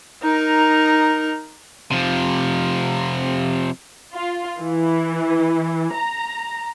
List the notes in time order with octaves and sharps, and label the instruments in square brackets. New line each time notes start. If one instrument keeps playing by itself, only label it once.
[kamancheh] D#4 A#4
[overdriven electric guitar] C3 F3
[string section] F4
E3
A#5